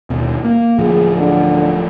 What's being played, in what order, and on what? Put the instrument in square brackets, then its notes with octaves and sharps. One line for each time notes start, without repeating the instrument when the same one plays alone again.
[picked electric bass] D#2 B2
A#3
[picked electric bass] D1 A2 F3 [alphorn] G#4
[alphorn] D3